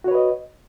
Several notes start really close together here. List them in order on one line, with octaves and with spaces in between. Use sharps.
F#4 C#5 B4 D#5